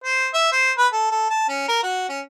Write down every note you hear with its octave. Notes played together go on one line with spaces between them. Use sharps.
C5
E5
C5
B4
A4
A4
A5
C#4
A#4
F#4
C#4